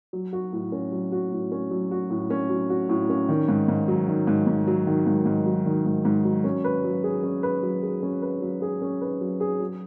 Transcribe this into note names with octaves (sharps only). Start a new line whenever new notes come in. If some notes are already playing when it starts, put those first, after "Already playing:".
F#3
F#4
A2
C#4
F#3
F#4
A2
C#4
F#3
F#4
A2
C#4
F#3
F#4
A2
C#4
D#3
G#2
G#2
F#3
D#3
G#2
G#2
F#3
D#3
G#2
G#2
F#3
D#3
G#2
G#2
F#3
C#4
B4
F#3
G#4
C#4
B4
F#3
G#4
C#4
B4
F#3
G#4
C#4
B4
F#3
G#4
F#3